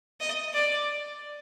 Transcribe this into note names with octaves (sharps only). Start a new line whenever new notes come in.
D#5
D5